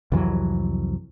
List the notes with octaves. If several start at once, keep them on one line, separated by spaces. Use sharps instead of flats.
C2 F2 E3 F#3